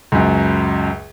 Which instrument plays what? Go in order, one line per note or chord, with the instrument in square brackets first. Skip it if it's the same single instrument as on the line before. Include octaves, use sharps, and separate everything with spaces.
[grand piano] C#2 F#2